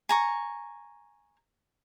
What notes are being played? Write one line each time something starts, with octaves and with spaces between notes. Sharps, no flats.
G#5 A#5 C#6